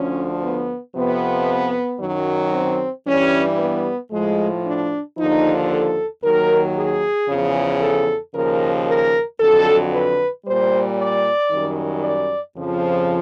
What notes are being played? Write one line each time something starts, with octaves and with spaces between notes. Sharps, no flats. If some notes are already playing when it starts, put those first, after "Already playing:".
Already playing: D2 D3 F3 C#4
B3
F2 C3 F3 B3
F#2 D#3 F#3
C4
G2 E3 G3 C#4
B3
A2 F3 G#3
D4
D#2 D3 F3 D#4
A4
D#2 D#3 F#3 A#4
G#4
E2 C#3 F3
A4
D#2 C#3 F3 A#4
A#4
F2 D3 F#3 A4
B4
G3 C5
A#2
D5
F#2 D#3 G3
D5
F2 C#3 F3